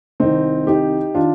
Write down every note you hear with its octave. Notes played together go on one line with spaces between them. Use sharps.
C2 C3 D#3 C4 D#4
D#4 G4
D#3 D4 F4